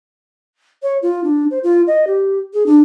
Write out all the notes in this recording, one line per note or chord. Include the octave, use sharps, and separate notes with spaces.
C#5
F4
D4
C5
F4
D#5
G4
G#4
D4